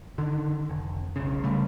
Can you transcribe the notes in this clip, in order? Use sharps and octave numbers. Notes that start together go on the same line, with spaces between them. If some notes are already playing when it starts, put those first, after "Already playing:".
D3 D#3
F1
B1 C#3
C2 C#3 G3 A3